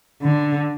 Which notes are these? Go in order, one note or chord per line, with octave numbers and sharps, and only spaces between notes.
D3